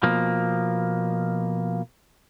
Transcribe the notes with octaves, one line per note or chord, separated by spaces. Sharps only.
B2 F3 A#3